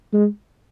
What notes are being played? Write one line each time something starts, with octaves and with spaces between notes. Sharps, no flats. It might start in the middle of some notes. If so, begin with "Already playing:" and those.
G#3